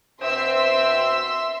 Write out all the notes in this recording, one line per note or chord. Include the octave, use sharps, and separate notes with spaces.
B2 C4 E5 C6 E6